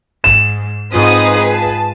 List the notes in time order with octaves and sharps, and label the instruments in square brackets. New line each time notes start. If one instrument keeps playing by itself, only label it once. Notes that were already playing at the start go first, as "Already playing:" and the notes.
[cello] G#2 [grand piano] E7
[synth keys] G#2 F4 D#7 [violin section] C4 D#4 D#6 [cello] G#4 B4
[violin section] A5